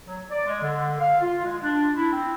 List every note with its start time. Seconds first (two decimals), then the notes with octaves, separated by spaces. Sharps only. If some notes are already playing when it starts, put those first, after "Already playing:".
0.06 F#3
0.30 D5
0.46 G#3
0.62 D3
0.98 F5
1.21 F4
1.44 G#3
1.61 D4
1.96 E4
2.12 C4